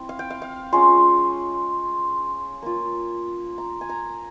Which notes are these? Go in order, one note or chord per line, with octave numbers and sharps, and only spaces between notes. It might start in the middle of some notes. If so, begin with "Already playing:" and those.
Already playing: C4 E4
F5
G5
F5
F5
G#3 C#4 F4 C6
A#3 F4
A#5
G#5
A#5